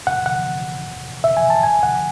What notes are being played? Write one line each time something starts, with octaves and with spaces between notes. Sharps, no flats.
F#5
F#5
E5
G#5
A5
G#5
F#5